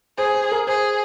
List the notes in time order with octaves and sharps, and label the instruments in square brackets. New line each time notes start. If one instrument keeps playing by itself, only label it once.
[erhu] G#4 [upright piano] C5
[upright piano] C5
A#4
[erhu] G#4 [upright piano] C5